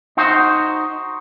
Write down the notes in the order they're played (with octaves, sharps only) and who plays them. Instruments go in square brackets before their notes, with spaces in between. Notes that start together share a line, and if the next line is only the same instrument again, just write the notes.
[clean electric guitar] D#4 F#4 C5